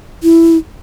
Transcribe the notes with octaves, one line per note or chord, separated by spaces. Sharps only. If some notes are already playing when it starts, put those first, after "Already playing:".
E4